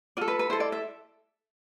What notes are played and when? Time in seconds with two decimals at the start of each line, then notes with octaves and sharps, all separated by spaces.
0.17 F4 A4 D5
0.28 B4
0.39 B4
0.50 E4 A4 C5
0.60 D5
0.72 E5